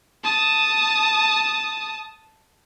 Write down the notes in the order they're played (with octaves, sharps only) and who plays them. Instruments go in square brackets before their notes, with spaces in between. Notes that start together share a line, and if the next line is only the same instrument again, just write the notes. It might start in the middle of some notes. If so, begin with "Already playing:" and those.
[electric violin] A5 D#6